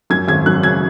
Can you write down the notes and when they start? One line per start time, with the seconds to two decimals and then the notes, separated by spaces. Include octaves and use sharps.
0.10 F#2 G#6
0.28 G#1 G#6
0.46 F#2 F#6
0.63 C#3 G#6